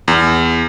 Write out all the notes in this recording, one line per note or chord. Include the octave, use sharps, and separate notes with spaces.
E2